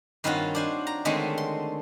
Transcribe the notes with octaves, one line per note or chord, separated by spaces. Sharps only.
G2 D#3 C4 C#4 F4 F#4
D4 C5 G#5
A#5
D3 D#3 G#3 A3 C4 C#4
C6